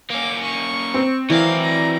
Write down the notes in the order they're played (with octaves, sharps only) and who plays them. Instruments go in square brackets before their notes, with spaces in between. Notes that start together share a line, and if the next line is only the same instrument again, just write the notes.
[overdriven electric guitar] A#3 C#4 [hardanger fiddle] D6
[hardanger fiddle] C#6
[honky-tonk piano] C4
[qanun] E3 [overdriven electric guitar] F#3 D5 [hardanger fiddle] A#4 F5
[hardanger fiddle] A#5